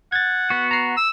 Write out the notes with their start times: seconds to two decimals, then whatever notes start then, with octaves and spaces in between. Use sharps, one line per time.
0.12 F#5 G#6 A6
0.50 B3 F#4
0.71 A#5 C7
0.97 E6